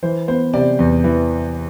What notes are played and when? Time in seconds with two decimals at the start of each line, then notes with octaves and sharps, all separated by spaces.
0.03 E3 C5
0.28 B3 C5
0.53 C3 D5
0.79 E2
1.04 E3